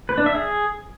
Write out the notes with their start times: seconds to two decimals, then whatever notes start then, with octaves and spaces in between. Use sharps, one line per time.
0.09 B4
0.18 D4
0.26 E5
0.35 G#4